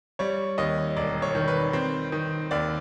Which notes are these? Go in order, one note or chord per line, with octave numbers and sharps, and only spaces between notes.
G3 C#5
D#2 D#5
E1 D5
C#5
D#3
B4
C4
D#3
D#2 D5